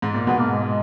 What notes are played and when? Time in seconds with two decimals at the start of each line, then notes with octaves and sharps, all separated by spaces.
0.02 G#2
0.14 A#2
0.27 G#2 B2 B3
0.39 A#3
0.51 G#3
0.63 G#3